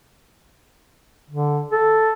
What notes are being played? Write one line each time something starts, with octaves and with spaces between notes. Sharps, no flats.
D3
A4